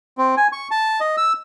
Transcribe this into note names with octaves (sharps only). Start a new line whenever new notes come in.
C4
G#5
C#6
A5
D#5
E6